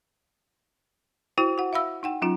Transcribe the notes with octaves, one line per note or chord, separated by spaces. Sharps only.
E4 F#4 C5 G5
F#4 F#5
E5 F5 B5 E6
D#4 F#5 G5
F#3 C#4 D#4 F4